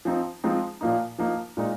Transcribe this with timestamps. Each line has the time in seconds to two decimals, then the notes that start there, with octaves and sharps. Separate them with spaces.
0.05 F3 C4 D#4
0.44 F3 G#3 C4 D#4
0.81 A#2 F3 A#3 D#4
1.19 F3 A#3 D#4
1.57 A#2 G#3 D#4